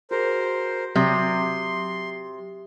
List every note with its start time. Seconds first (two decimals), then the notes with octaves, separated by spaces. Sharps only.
0.11 F#4 G#4 A#4 C5
0.95 C3 F#3 E5 C6 D#6